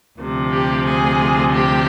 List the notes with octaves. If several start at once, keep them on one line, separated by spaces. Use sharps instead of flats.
D2 C3 F3
G4
G#4
G4